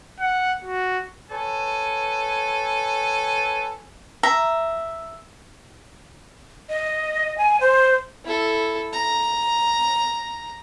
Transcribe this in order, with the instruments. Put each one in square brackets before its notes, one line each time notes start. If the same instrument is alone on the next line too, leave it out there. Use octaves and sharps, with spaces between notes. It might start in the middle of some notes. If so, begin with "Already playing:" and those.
[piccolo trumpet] F#5
F#4
[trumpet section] A4 B4 C#5 G#5
[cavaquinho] E5 A#5
[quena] D#5
G#5
C5
[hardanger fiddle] E4 A4
A#5